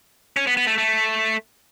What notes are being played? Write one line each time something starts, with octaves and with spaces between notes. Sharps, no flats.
C#4
B3
B3
A3
A3